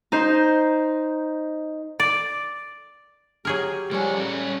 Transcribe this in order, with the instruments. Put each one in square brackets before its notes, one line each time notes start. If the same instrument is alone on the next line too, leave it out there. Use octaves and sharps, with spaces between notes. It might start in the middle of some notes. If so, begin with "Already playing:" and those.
[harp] D#4 C5
[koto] D5
[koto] F#3 G#4 A#4 [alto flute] G4
[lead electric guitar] F3 C#5 [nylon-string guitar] G3 G#5
[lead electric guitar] C#4 A4